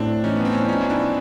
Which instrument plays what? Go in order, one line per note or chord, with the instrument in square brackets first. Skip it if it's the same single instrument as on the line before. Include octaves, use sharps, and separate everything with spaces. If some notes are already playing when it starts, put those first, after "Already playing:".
Already playing: [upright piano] A2 [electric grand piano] C4 D4
[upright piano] E3 [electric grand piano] C#4 D#4
[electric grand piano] B3
C4
C#4
D4
[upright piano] F3 [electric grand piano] C#4 D#4
[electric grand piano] D4 E4